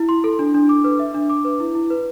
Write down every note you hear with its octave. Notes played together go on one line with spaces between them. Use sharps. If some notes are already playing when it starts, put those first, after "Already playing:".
Already playing: E4
C6
A4
D4
D4
D6
B4
E5
D4
D6
B4
E4
E4
B4